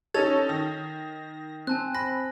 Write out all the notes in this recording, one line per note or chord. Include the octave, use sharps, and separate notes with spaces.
C#4 D#4 A4 C#5 G#6 A6 F7
D#3 A#6
C4 G#5 A5 F#6
B5 A#6